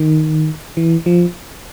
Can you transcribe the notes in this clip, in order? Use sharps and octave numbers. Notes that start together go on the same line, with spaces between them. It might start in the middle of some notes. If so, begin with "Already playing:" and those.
Already playing: D#3
E3
F3